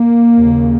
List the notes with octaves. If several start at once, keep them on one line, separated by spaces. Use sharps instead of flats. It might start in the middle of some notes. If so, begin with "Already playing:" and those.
Already playing: A#3
D#2 C#3